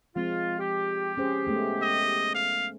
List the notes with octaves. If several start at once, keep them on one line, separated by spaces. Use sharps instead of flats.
F3 G#3 C4 F4
G4
C#4 G#4 C5
G#3 A3 B3
D#5
F5